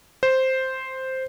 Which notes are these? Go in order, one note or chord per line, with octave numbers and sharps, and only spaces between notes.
C5